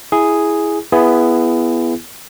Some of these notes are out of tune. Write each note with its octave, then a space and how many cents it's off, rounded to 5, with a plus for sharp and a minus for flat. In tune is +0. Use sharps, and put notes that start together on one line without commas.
E4 +0 G#4 +0
B3 +0 E4 +20 G#4 +0